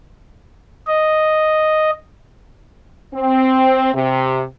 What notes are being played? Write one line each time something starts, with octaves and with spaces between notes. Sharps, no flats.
D#5
C4
C3